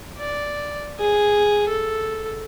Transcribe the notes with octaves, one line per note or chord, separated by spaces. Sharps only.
D5
G#4
A4